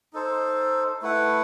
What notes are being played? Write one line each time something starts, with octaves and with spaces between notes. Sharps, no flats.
D#4 A4 C5
A3 E4 B4 F#5